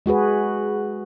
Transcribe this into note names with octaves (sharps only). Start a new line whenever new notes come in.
G#3 F#4 G#4 B4